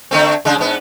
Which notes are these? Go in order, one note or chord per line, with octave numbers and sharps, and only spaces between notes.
D3 A3 C4
C#3 G#3 D4
G#2 B3